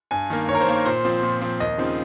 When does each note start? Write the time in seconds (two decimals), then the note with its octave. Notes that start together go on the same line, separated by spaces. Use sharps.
0.11 G2 G#5
0.30 D#3 A#3
0.48 G2 C#5
0.55 A#4
0.61 C5
0.66 D#3 A#3
0.85 A#2 C5
1.05 F3 C4
1.23 A#2
1.41 F3 C4
1.60 D#2 D#5
1.78 C#3 F3 C4 D#4